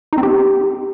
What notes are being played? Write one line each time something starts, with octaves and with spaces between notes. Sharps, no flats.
D#4
C4
G4